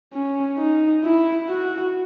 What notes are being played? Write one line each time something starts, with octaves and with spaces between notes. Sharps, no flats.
C#4
D#4
E4
F#4